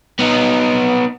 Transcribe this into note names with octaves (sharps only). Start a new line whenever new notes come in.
B3 D#4